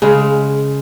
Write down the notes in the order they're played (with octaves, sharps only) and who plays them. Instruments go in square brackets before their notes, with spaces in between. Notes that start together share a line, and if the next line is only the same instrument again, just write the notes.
[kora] C#3 G#3